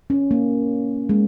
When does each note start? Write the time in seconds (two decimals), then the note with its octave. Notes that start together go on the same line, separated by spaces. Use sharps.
0.10 C#4
0.31 A#3
1.09 G#3